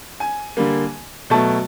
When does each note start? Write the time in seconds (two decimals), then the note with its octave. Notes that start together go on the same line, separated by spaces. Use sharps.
0.20 G#5
0.57 D3 G3 A#3
1.30 B2 F#3 A3 A5